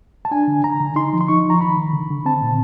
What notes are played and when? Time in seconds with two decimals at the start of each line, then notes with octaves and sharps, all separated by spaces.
0.25 A5
0.31 D4 G#5
0.48 D3
0.64 D3 A#5
0.80 D3
0.96 D#4 C6
1.13 F3
1.21 C6
1.28 D#4 C#6
1.45 F3
1.50 A#5
1.61 D#3 B5
1.77 D#3
1.93 D3
2.10 D3
2.25 C4 A5
2.42 A#2